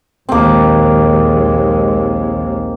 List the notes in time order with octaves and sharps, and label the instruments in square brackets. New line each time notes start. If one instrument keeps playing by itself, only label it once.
[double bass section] A#1 D#2 G#3 [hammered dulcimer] A#3 C4